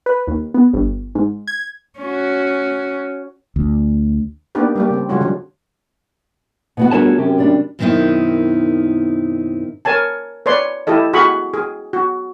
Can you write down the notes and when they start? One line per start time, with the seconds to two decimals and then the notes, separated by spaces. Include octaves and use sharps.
0.06 B4
0.27 D#2
0.54 B3
0.73 G1
1.15 G#2
1.48 G#6
2.00 C#4 F#4
3.56 D2
4.55 A#3 B3 D4 D#4 G4 B4
4.75 G3 A#3 G4
4.90 C#3 C4
5.09 C#3 G3 G#3 F4 F#4 C#5
5.21 D3 F#3
6.77 B2 B3 F#4
6.91 G1 F#4 G#4 A#4 C#5 A5
7.18 F#2 C3 G4
7.38 G3 D4
7.79 F#2 B2 D#3 C4 D#4 E4
9.85 A#4 C#5 G#5 A5
10.46 B4 C#5 D5 C6
10.87 E4 G4 A4 D#5
11.13 F#4 G#4 B5 C#6
11.54 G#4
11.93 F#4